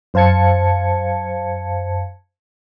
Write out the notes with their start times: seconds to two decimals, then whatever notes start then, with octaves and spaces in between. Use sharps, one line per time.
0.14 F#2 C5 F5 A5 G#6 C#7